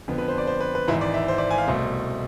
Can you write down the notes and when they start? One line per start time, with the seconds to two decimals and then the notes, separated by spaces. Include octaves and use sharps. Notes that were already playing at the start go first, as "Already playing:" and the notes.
0.08 F2 D3 F3 B3
0.18 B4
0.28 C5
0.38 D5
0.47 C5
0.60 B4
0.75 B4
0.88 G#1 G#2 E3 E4
1.01 D5
1.14 E5
1.28 C5
1.38 D5
1.51 G#5
1.58 F5
1.68 C2 B2 A3 C5